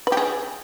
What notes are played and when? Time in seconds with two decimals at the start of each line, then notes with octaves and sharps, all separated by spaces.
0.07 B4
0.12 G4
0.17 G#4